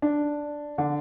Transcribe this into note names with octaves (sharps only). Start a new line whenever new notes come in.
D4
D3